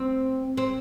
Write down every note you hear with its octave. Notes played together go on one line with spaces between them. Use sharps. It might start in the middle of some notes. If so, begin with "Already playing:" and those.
Already playing: C4
C4